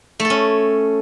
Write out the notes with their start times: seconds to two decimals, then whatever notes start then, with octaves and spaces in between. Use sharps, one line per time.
0.20 A3
0.25 A4
0.30 C#4